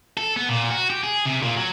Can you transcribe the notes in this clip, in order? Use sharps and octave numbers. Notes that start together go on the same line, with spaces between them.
A4
B3
A#2
F#4
G4
G#4
C3
A#2
F#3